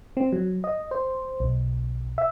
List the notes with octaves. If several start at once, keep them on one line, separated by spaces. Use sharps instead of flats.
C4
F#3
D#5
C5
B1
E5